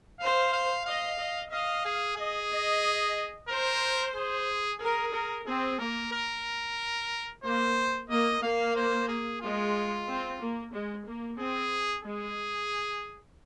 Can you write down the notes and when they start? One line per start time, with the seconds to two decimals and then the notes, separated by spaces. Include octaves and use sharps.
0.20 C5 F5
0.53 F5
0.86 D#5 F5
1.19 D#5
1.51 D#5 F5
1.85 G#4
2.17 G#4 D#5
2.51 D#5
3.49 A#4 C5
4.15 G#4
4.81 G#4 A#4
5.14 A#4
5.46 C4 G#4
5.79 A#3 A#4
6.12 A#4
7.43 A#3 C5
8.09 A#3 D#5
8.42 A#3 F5
8.75 C5
9.08 G#4
9.41 G#3 F4
10.07 C4
10.40 A#3
10.73 G#3
11.06 A#3
11.38 C4 G#4
12.04 G#3 G#4